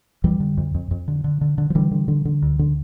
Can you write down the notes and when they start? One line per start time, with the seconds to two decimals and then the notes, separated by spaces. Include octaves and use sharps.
0.24 F2 E3 G3
0.40 D3
0.57 F2
0.74 F2
0.91 F2
1.08 D3
1.24 D3
1.41 D3
1.58 D3
1.70 F3
1.75 D3 E3 G3
1.91 D3
2.08 D3
2.25 D3
2.42 D2
2.59 D3